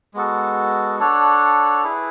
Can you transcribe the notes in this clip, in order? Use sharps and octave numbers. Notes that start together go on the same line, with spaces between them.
G#3 B3 F#4 A4
D4 A4 C#5 F#5
E4 G#4 B4